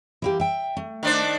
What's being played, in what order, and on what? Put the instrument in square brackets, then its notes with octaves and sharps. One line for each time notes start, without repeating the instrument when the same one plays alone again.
[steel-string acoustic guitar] E3 A#3 G4
E5 G5
A3
[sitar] D#3 D4 C5